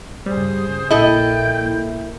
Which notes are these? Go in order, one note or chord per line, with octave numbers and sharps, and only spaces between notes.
G2 C#3 G3 G#4 C5 D#6
A#1 A#2 A#3 E4 A4 D#5 G5 G6